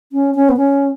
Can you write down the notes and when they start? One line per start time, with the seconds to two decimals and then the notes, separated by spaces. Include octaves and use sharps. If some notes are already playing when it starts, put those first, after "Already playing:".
0.12 C#4
0.35 C#4
0.49 B3
0.57 C#4